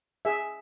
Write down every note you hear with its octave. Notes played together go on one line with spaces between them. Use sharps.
G#4 E5